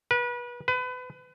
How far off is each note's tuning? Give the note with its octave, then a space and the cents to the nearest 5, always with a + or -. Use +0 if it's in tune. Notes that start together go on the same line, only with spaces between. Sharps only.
B4 -30
B4 +30